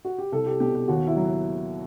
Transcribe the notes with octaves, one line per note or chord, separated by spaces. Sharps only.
F#4
G4
C2 A4
G4
B2 G4
G4
D#2 F#4
E4
F#3